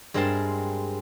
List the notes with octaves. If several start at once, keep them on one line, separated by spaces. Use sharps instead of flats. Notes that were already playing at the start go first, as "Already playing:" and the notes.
G2 G#3 C4 A#4 A5 C6